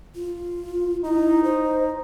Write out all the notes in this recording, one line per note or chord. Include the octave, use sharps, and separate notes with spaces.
F4
D#4 E4
C5